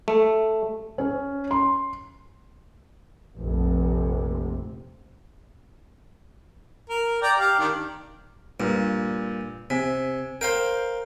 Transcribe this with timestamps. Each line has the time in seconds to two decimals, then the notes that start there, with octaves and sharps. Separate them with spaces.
0.08 A3
0.98 C#4
1.51 C6
3.37 F1 A#1 F2 C3
6.90 A#4
7.22 D5 G5 A#5
7.38 G4 F5
7.59 D#3 D4
8.60 G2 A#2
9.70 C3 G#5 B6
10.41 A#4 C5 F5 G5